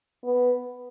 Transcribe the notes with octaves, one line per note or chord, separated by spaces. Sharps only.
B3